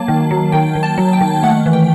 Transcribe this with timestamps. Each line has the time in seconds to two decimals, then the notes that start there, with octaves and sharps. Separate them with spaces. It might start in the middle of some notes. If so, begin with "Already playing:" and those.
Already playing: F#3 A#3 A5
0.08 D#3
0.31 F#3
0.52 D#3 G5
0.75 D#3
0.83 A5
0.98 F#3
1.13 G5
1.21 D#3
1.43 A3 F#5
1.66 E3
1.73 G5